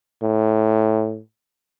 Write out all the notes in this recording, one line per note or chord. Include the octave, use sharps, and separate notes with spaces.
A2